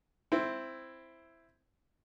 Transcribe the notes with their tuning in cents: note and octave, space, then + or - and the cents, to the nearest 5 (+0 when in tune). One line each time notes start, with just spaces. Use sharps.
C4 +0 E4 +5